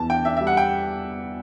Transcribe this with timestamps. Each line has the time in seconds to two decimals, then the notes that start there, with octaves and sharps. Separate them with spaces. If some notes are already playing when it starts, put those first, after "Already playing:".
Already playing: E2 E3 A5
0.10 D4 G5
0.25 D4 E5
0.37 G3 E5
0.47 F#5
0.57 G5